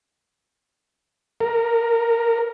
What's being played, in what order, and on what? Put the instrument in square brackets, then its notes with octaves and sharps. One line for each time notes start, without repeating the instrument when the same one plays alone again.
[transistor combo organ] A#4